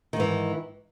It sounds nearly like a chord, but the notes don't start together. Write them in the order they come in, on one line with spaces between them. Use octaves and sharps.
D#3 G#2 E3